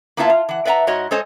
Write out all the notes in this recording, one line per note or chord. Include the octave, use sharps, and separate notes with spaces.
A#3 B3 E4 F4 E5 A5
F4
E3 F#5
B4 D5 E5 F#5 A#5
G#2 F#4 C#5 D#5
G#3 A4 C5 C#5 D#5 G#5